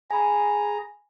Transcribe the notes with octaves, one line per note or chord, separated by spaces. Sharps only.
G#4 G#5 A#5 B5